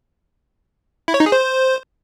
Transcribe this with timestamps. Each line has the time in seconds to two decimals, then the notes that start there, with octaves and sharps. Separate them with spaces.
1.08 E4
1.14 C#5
1.20 D#4
1.26 G#4
1.32 C5